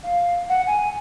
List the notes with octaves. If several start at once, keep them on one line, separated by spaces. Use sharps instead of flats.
F5
F#5
G#5